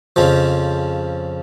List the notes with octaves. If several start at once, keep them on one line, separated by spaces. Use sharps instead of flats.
F2 C#3 F3